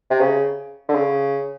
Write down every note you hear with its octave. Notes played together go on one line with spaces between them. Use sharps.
C3
C#3
D3
C#3